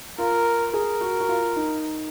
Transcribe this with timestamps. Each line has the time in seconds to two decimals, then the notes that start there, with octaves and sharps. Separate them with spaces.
0.18 F4 A#4
0.73 G#4 A#4
1.01 F#4
1.20 F#4
1.29 F4
1.56 D#4